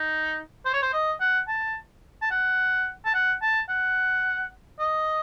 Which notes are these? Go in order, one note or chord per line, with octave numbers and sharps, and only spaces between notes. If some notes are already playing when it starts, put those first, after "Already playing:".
Already playing: D#4
C5
C#5
C5
D#5
F#5
A5
A5
F#5
A5
F#5
A5
F#5
D#5